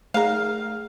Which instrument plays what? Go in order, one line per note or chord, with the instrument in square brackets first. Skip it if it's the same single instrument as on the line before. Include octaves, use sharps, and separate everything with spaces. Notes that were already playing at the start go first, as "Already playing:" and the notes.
[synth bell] A3 G#4 [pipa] A#4 F5